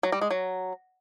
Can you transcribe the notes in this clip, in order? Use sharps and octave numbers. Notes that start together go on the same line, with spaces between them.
F#3
G3
G#3
F#3